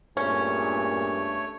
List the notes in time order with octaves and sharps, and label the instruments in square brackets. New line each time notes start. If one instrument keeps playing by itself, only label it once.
[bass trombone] G2 [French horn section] A#2 B3 G#4 [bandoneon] A3 C#5 [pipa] C#4